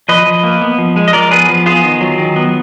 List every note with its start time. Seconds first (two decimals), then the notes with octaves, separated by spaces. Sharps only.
0.09 F3 B4 D#5
0.26 F3
0.43 A#3
0.62 B3
0.78 F3
0.96 G#3
1.08 D#5
1.13 F3 A#4 D5
1.31 B3 G#4 B4
1.49 F3
1.66 B3 F4 G#4
1.84 D#3
2.01 F#3
2.18 D#3
2.36 B3